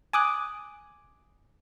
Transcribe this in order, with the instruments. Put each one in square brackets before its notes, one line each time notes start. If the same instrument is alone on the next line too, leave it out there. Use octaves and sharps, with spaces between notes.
[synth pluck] G#5 D6 D#6 F#6